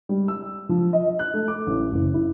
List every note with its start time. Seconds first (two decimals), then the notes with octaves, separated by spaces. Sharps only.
0.09 G3
0.28 E6
0.69 F3
0.93 D#5
1.19 F#6
1.34 A3
1.48 D6
1.67 A1
1.92 F#1
2.14 E4